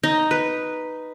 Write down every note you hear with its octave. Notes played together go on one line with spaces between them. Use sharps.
D#4
B4